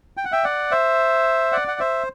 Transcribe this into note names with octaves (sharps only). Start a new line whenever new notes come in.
G5
F#5
E5 G5
D5 F#5
C5 E5
D5 F#5
F#5
C5 E5